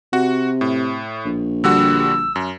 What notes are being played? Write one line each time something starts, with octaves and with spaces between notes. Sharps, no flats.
C3 F#4
A2
A#1
D3 G3 F#4 E6
F#2